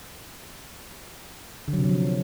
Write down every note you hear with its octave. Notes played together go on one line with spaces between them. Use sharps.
D3
F#3
C3
F#3
F3